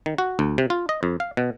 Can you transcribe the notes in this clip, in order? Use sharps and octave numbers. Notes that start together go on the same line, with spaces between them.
D#3
F#4
D2
C3
F4
D#5
F2
F5
B2